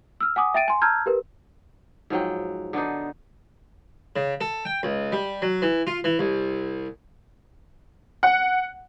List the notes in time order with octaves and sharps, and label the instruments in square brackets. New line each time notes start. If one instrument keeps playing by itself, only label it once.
[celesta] E6 F6
F#5 G#5 D6 D#6
E5 G5 A6 D7 D#7
G#5 C6
A5 A#5 E6 F6 G6 G#6
G4 A#4 B4
[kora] G#2 F3 F#3 G5
D3 B3 D4 D#4
[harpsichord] C#3
A4
G5
C#2
G3
F#3
E3
F4
E3
C2
[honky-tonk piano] F#5